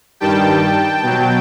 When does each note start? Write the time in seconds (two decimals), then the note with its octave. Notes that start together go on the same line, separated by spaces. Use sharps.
0.20 G2 D#3 G3 G5 A5
1.03 B2 F#3